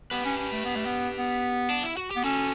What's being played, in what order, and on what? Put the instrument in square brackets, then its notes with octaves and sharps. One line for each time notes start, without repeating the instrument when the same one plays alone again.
[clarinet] B3 [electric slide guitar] G4 B4
[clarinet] C#4
C#4
A3
B3
A3
B3
B3
[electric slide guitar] D4
E4
F#4
G4
[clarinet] B3
[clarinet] C#4 [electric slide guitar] F#4 A4